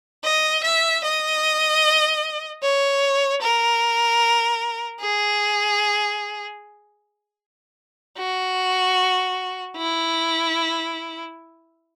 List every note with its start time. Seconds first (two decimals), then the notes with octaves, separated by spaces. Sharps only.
0.24 D#5
0.64 E5
1.04 D#5
2.63 C#5
3.42 A#4
5.01 G#4
8.18 F#4
9.77 E4